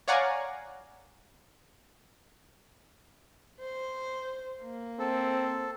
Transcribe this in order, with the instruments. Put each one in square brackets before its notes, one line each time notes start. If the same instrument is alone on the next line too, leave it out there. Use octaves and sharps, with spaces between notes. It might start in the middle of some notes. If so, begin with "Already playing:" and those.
[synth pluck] C#5 D5 F5 F#5 G#5 A#5
[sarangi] C5
A#3
[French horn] C4 [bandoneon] A4